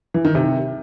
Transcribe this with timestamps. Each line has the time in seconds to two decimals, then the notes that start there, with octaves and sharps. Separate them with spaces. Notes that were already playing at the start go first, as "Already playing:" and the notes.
0.14 E3
0.25 D#3
0.35 C3